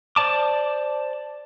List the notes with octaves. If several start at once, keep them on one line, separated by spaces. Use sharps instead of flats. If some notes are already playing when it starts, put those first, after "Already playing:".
C5 D5 A5 D6